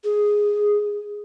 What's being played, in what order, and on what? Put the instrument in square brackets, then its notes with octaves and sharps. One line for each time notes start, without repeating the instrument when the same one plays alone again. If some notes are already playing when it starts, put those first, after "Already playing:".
[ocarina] G#4